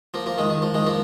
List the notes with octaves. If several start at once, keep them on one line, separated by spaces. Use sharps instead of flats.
F3 A#3
F3 A#3
D#3 G#3
D#3
F3
D#3 G#3
F3 A#3